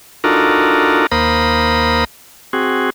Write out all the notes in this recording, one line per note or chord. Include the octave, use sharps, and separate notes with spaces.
D4 D#4 F4 F#4 A4 A#4
D#2 A#3 A#4 C5 B5 D#6
C4 F#4 G#4